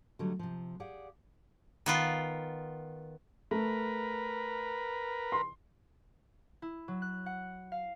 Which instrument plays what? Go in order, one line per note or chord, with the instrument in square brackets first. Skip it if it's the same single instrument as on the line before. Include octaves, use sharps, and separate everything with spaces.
[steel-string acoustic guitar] D3 D#3 F#3 G3 A3 D#4
C3 F3
G4 G#4 D5 F5 F#5
[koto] D#3 B3 F4
[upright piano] A3 [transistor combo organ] A#4 B4
[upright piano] C6
[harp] E4
F#3
F#6
F#5
F5